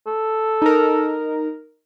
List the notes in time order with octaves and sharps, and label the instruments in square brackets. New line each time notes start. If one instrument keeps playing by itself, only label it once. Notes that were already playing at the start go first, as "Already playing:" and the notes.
[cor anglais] A4
[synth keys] D#4 A#4